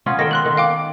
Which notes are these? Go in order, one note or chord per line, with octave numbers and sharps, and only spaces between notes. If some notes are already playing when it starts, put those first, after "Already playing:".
B3 C#4 F4
D#3 A4 G5 A#6
C6 F#6 F#7
D#3
F5 G5 D6